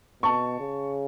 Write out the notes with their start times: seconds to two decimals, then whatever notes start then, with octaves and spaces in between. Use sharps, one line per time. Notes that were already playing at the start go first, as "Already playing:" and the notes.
0.23 B2 A5 C#6
0.60 C#3